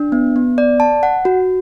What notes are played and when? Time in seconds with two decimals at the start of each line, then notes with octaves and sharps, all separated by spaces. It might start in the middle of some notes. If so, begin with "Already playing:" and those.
Already playing: D4
0.12 B3
0.36 B3
0.58 D5
0.80 A5
1.03 F#5
1.25 F#4